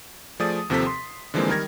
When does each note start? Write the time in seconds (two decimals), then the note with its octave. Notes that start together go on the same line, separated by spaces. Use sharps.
0.40 F3 A3 G#4 D5 D#6 A6
0.70 D#2 C3 F3 C4 A4 B6
0.87 C6
1.34 D3 E3 F3 G#3 A#3 C4
1.48 D#3 G3 A#4 G#6 A#6